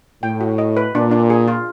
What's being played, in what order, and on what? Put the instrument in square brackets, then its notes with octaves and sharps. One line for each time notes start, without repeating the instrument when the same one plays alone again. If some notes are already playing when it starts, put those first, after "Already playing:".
[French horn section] A2 [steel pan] G5
[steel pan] F#4
D#5
B4
[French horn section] A#2 [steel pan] D4
[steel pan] D4
G#4
F4